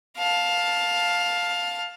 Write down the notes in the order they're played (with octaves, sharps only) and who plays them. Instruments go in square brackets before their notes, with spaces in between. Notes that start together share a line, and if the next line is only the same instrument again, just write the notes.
[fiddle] F5 A5